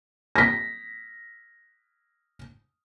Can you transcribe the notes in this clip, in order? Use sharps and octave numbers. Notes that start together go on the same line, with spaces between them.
A#6 B6